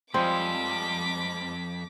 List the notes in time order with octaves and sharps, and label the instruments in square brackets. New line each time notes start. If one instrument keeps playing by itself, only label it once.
[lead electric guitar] F2 [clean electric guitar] F3 G3 G#3 [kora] C4 [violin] D6 B6